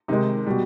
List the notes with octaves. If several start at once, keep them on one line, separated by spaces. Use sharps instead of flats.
C3 D#3 G#3 D#4
B2 G3